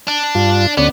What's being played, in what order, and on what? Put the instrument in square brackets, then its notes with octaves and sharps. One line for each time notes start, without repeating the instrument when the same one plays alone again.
[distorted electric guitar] D4
[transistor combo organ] G2 F4
[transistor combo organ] D2 C#4 D5 [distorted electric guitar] B3